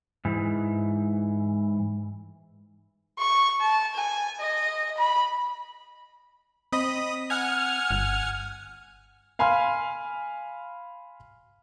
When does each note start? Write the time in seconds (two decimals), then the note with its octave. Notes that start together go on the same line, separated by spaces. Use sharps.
0.25 G#2 E3
3.19 C#6
3.61 A5
3.95 G#5
4.40 D#5
4.98 B5
6.72 C4 D#5 B5 D#6
7.30 F#5 G#5 F6 G#6
7.91 G1
9.39 F5 G#5 B5 C6 F6